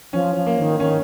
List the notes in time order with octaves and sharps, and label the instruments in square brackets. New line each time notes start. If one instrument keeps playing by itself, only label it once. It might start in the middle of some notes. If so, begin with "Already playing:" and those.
[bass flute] F3 [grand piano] C#4
[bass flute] F3
[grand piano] A#3
[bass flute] D#3
[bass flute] D#3 [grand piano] C#4